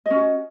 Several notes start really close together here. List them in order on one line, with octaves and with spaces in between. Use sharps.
D#5 C#4 F#4